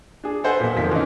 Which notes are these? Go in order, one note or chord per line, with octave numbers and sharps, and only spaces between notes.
D4 G#4
A4 B4 C5 D#5 F#5 G#5
B1 A#2
F1 D#3 F3 B6
E3 C#4 D#4